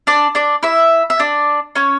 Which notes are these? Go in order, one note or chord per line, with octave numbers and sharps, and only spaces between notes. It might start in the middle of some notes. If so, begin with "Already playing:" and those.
D4 D5
D4 D5
E4 E5
E5
D4 D5
C#4 C#5